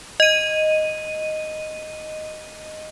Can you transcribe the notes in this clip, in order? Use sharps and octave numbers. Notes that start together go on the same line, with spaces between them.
D#5 D#7